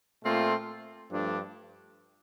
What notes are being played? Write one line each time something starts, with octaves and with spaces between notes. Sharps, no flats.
A#2 A3 C4 F4
G2 F3 A3 D4